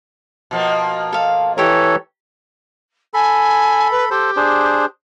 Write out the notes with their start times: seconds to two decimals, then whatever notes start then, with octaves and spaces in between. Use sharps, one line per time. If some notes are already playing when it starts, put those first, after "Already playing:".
0.51 B2 F3 A#3
1.12 A4 F5
1.58 E3 G4 A4 A#4 C#5
3.14 A4 G#5 B5
3.91 B4
4.10 G4 A4 C5
4.36 D4 G#4 C5